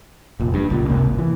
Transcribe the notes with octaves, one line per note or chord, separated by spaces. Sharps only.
F1 A#2
G2
C#2 A#2
G1 D#2 C3 A#3
G#1
E3